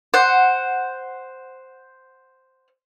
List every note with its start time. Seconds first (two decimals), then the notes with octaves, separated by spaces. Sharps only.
0.14 C5 F#5